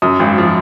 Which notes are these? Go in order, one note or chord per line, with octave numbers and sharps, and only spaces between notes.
F#2 D#6
G#1
F3